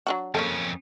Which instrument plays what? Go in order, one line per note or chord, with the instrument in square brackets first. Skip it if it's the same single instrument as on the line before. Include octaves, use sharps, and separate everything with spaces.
[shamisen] F#3 D4 F#4
[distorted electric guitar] F2 C#4 [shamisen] C#3 A#3 A4